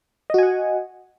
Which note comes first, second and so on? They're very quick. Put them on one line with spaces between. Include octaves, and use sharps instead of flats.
D#5 F#4 G#5 F#5